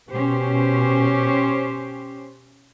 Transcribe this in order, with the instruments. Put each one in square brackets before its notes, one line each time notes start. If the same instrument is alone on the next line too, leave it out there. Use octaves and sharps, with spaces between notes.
[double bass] B2 [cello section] C#4 G4 C5